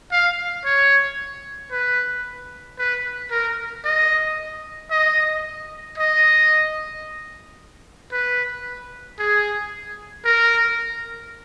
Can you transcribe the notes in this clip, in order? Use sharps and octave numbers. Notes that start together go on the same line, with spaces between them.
F5
C#5
B4
B4
A#4
D#5
D#5
D#5
B4
G#4
A#4